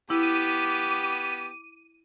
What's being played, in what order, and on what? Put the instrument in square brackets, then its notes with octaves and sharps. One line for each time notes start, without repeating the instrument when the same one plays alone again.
[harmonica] B3 G4 [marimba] E4 [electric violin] D6 [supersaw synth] D#7